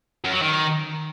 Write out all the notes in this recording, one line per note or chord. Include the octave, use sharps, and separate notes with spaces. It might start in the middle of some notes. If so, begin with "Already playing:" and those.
F#2
F#3
D#3